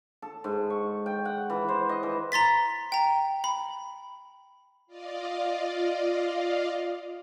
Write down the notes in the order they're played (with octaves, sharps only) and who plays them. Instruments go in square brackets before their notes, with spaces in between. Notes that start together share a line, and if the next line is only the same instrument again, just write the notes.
[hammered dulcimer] A4
G#2
C#6
G5
F#5
E3
C5
D#5
E3
[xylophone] A#5 C6 A6 B6
G5 A#5
B5
[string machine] F4 D5 D#5 F5